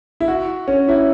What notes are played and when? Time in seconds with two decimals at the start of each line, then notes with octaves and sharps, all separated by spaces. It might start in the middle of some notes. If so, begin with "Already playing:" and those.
0.20 E4
0.28 F#4
0.68 C#4
0.88 E4